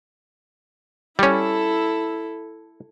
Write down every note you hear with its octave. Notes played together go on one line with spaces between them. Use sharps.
G3 C#4 E4 A4